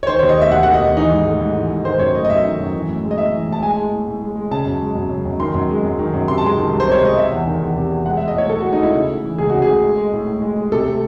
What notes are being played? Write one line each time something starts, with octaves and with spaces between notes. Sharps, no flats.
C#5
D#3 C5
D#2 C#5
D#5
A3 E5
D#2 F#5
D#3 F#5
D#5
D#2
E3 D#4
G#2
A3
G#2
E3
G#2
D#3 C5
F#2 C#5
A3 D#5
D#5
F#2 E5
D#3
F#2
E3
A2
G#3
D#5
A2 E5
E3
A2 A5
G#3 G#5
G#3
A2
A2
G#3
G#3
C#3 A5
F#2
G#3
F#2
C#3
F#2
D#3 C6
F#2
G#3
F#2
D#3
F#2
C3 C6
A5
G#3 C6
D#3
C2
C5
C3 C#5
G#3 D#5
C3 E5
E2
D#3
E2
C3
E2
G#3 F#5
G#3 E5
D#5
A2 C#5
A2 A4
G#3 F#4
D#4
G#3 E4
C#3
A3
E3
C#2 G#4
C#3 F#4
G#4
A3
G#3
G#3
A2
A2
G#3
G#3
C3 A4
A3